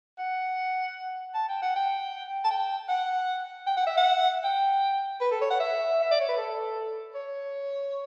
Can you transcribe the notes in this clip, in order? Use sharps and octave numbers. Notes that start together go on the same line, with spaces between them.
F#5
A5
G5
F#5
G5
A5
G5
F#5
G5
F#5
E5
F#5
G5
B4
A4
C#5
F#5
E5
E5
D5
C#5
B4
A4
C#5